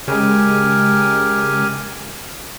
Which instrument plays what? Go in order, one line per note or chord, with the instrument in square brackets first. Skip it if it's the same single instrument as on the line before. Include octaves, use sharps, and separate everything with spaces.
[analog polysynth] C#3 G#3 [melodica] G4 A#4 G#5